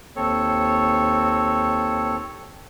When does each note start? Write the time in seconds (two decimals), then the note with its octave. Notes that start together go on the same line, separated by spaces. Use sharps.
0.16 D#2 C4 A4 C#5